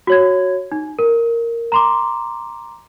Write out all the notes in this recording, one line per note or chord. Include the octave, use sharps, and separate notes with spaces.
F#4 C#5 G#6
D#4
A#4
A#5 C6 D6